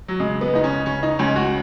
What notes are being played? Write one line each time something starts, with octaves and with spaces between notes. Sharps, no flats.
F#3
C#3 G#3
B3
C#2 D#4
C#4
C#3 C#4
D#4
C#2 C#4
F#4